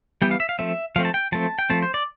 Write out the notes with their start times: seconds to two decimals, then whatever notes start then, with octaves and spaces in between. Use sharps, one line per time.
0.22 E3 G3 B3 G5
0.31 F5
0.40 E5
0.49 F5
0.59 F3 A3 C4 E5
0.96 F3 A3 C4 F5
1.05 A5
1.14 G5
1.32 F3 A3 C4 A5
1.59 G5
1.70 F3 A3 C4 A5
1.82 C5
1.94 D5